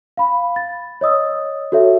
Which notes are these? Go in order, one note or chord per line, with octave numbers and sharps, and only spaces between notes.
F5 B5
A6
C#5 D#5 D#6 E6
F#4 A4 C#5 E5